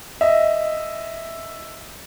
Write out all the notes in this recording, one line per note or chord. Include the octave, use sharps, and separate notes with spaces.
D#5 E5